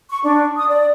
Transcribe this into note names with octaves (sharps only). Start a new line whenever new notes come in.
C#6
D4
D#6
D5